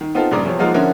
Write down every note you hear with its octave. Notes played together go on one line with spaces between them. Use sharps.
D#3
B3 C4 D#4 F4 A4
A#1 G2 C#3 D5 A#5
E2 C3 F3 C#5
F3 G#3 A#3 D#4 F4 F#4
D3 F3 C#4 E4 F#4 A#4